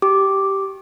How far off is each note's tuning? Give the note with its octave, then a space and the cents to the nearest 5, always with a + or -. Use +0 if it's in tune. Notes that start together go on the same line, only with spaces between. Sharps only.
G4 -10 D6 +0